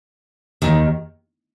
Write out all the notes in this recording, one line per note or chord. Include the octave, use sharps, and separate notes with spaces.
D#2 D#3